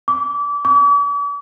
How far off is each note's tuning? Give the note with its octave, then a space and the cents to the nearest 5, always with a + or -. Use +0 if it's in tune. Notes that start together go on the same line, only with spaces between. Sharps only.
D6 -25
D6 -45